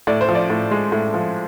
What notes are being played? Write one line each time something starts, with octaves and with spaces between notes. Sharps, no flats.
A2 D5
C5
F3
D5
A2
G#3
A2
F3